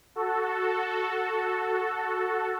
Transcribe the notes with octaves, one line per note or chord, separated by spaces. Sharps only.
F#4 A4